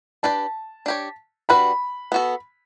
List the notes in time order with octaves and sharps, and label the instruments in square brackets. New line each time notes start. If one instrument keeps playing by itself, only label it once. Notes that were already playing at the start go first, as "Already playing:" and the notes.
[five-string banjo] D4 G4 B4 D5 [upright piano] A5
[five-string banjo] D4 G4 C#5
[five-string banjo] G3 D4 F#4 B4 [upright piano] B5
[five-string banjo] B3 F#4 A4